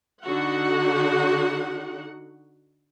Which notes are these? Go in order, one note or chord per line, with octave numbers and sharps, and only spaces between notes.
D3 D#4 F#4 F#5